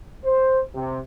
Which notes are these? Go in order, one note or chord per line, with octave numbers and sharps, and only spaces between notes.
C5
C3